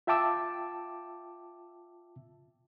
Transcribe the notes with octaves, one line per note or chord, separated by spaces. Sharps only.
F4 E5 G5 A5 D6 E6